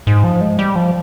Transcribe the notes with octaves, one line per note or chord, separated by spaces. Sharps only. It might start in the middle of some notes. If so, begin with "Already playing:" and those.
G#2
F3
G#3
G3
F3